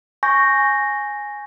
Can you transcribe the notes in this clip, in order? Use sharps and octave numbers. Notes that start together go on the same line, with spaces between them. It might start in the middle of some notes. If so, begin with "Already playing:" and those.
G#5 C#6 G6 A#6